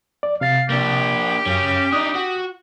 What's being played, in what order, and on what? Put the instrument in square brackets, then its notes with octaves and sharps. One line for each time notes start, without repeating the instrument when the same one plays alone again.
[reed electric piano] D5
[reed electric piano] C3 A6 [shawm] F5
[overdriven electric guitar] A#3 D4 [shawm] G4
[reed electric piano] F#2 [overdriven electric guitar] C#4 G#4
[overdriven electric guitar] D4 D#4 [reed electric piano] D#6
[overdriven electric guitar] F#4